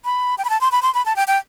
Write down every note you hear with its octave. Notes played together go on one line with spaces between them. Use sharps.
B5
G5
B5
A5
C6
B5
C6
B5
A5
G5
G5